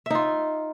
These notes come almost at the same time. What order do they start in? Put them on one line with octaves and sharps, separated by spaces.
E5 D#4 F4